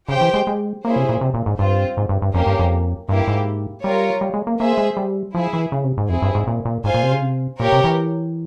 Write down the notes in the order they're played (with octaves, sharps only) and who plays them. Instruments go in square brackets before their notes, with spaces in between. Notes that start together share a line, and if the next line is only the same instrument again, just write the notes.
[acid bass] C#3 [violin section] G4 C5 G5
[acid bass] E3
G#3
G#3
[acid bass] A#3 [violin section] C#4 E4 G#4 C5
[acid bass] C3
A#2
C3
A#2
G#2
[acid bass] G2 [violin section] C4 F4 C5
[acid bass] G#2
G2
G2
[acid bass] F2 [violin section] A#3 C#4 G4 A#4
[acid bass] G2
F2
[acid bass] G2 [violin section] A#3 E4 G4
[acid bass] G#2
[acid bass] G3 [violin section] F4 A#4 C#5
[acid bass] G3
G#3
A#3
[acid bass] A#3 [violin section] G#4 C5 E5
[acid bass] G#3
G3
[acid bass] F3 [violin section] E4 G#4 E5
[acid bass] E3
C#3
C3
G#2
[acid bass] F2 [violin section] C4 E4 G#4
[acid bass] G2
G#2
A#2
A#2
[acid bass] G#2 [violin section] F4 C5 F5 G#5
[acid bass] A#2
C3
C#3
C3
[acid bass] A#2 [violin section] G4 A#4 C#5
[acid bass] C3
E3